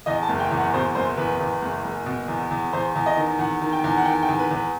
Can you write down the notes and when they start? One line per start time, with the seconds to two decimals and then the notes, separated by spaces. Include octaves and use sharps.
0.06 E2 D#5
0.23 A5
0.29 F#1
0.40 G5
0.50 E2
0.57 F#5
0.74 B2 C5
0.95 F#1 C5
1.17 E2 B4
1.40 E2
1.62 F#1
1.84 F#1
2.06 B2
2.28 E2
2.51 E2
2.73 E2 C5
2.95 E2
3.06 D#5
3.17 D#3
3.39 E2 F#5
3.61 D#3
3.72 G5
3.84 E2
3.97 F#5
4.05 D#3 G5
4.23 G5
4.29 E2
4.39 B4
4.51 E2 B4